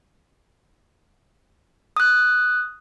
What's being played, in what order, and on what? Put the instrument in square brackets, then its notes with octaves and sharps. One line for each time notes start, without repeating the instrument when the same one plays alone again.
[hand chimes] D#6 F#6